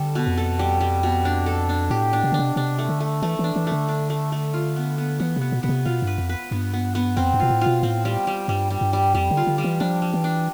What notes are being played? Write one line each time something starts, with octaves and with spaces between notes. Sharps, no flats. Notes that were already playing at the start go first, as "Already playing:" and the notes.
Already playing: D3 G3 A4
B2
F2
A4
G3
G3
B2
D4
A4
D4
A2 G4
D4
C3
D3 D4
C3
C3 D4
A3
D3
A3
E3 A3
E3 D4
E3
D3 A3
D4
A3
A3
F4
B3
B3
E3 B3
C3 B3
B2
B2 B3
C3
B2 F4
G2 B4
F2
B4
G2 B3
B3
B3
F2 C4
G2
B2 F4
A2
B2 F4
A2 C4
G3
G3
G2 G3
G3
G2
G3
F2 G3
D3
F4
D3
G3
E3
F3 D4
G3
E3
D4